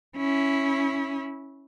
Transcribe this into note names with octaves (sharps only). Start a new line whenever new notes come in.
C#4 E4